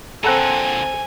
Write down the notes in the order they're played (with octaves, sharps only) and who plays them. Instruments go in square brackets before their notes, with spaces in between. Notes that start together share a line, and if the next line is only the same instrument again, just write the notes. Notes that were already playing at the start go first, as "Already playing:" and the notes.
[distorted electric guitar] A#2 D3 [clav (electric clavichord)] C4 F#5 A#5 [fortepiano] A4 [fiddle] G#5